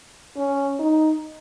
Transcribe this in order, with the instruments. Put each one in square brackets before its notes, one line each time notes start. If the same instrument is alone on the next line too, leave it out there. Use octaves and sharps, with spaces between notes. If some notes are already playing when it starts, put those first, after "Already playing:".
[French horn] C#4
D#4